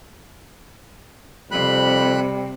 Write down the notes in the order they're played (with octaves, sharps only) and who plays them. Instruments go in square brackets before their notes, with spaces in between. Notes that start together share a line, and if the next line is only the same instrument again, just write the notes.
[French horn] F2 [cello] C3 [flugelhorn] G3 [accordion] B5 F#6